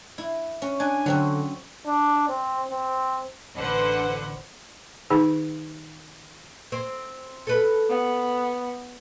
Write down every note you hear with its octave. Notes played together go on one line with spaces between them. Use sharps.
E4
C#4
D4 G#5
D3 F#3 C4 C#4
D4
C4
C4
A1 D3 B4 C5 F#5
D#3 D#4 G#4
C4
A4 B4
B3